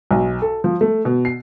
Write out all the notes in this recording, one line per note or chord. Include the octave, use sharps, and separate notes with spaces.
B1
A4
F3
A3
B2
C7